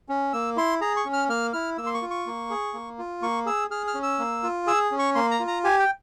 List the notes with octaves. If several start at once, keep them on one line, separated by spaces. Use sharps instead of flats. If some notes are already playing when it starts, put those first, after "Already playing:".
C#4
A#3 E6
E4 C6
G#4 A#5
C#6
C#4
F6
A#3 F6
E4 F6
A#3 E6
C6
C#6
F4
C#6
A#3
G#4
A#3
F4
A#3 C#6
G#4 E6
G#4 F6
F6
C#4
E6
A#3
F4
G#4 E6
C#4
C#6
A#3 C6
A#5
F4
A#5
G4 G#5
G5